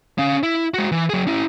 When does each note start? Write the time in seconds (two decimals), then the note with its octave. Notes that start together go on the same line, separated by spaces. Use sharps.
0.18 C#4 F5
0.43 E4
0.74 G#3 F#4
0.92 E3
1.10 F#3 G#4
1.27 C#4 E4